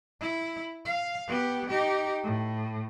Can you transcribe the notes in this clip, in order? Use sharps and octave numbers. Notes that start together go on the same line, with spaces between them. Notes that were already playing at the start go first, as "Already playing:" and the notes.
E4
F5
B3 G4
D#4 G4
A2